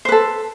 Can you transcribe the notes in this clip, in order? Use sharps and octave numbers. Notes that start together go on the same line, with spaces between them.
A4 B4 C5